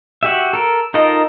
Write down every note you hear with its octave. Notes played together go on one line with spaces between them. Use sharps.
F#4 G4 E5
A4 A#4
D#4 F4 A4 A#4 D#5